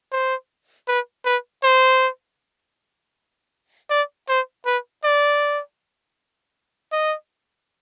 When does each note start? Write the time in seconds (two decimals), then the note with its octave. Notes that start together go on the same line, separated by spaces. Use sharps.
0.12 C5
0.88 B4
1.25 B4
1.63 C5
3.90 D5
4.29 C5
4.66 B4
5.04 D5
6.92 D#5